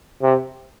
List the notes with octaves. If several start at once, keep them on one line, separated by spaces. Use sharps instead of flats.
C3